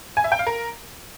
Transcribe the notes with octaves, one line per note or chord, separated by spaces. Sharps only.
G#5
E5
G5
F5
A#4